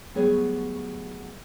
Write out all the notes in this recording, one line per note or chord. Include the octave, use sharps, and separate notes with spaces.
D2 F#3 G3 B3 G#4 C#5